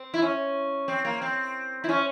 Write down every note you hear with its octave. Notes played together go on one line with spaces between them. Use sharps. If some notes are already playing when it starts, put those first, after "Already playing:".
Already playing: C4
E4
C#4
C4
A#3
C4
E4
C#4